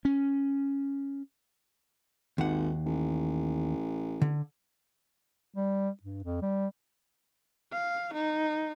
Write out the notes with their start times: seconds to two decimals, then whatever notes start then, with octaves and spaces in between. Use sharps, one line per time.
0.05 C#4
2.38 G#1 D#2 F#5
2.86 A1
4.22 D3
5.55 G3
6.03 G2
6.24 F2
6.42 G3
7.72 F5
8.14 D#4